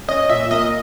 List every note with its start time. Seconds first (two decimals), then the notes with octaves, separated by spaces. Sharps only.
0.08 C#4 D#5
0.29 A#2 E5
0.51 A#3 D#5